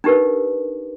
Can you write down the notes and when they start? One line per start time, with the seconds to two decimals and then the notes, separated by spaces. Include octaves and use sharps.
0.04 D4 D#4 G4 A#4 B4